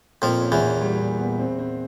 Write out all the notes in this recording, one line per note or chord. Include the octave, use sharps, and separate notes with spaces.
F2 A#2 F3
C#4
E2 E3
A#2
G3
A#2
B3
C4
C4